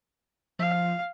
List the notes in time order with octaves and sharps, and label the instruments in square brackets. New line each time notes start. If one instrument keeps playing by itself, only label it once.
[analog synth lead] F3 [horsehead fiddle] F5